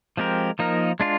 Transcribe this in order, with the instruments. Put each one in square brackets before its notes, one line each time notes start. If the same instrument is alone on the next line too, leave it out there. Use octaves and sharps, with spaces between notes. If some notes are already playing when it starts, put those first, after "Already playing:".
[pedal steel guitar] F3 G#3 C4 G4 A#4
F3 A#3 D#4 A#4
G#3 D4 F4